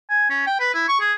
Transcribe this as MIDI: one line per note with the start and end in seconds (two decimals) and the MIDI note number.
0.10 0.28 80
0.30 0.44 61
0.47 0.56 79
0.60 0.73 71
0.74 0.85 64
0.88 0.96 85
1.00 1.13 68